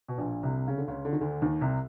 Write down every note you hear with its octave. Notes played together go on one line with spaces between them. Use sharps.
B2
A#1 A#2
C2 C3
C#3
D3
C#2 C#3
D3
D#3
D2 D3
D#2 D#3
C2 C3